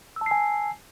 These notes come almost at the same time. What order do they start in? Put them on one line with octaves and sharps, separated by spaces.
E6 A5 C7 G#5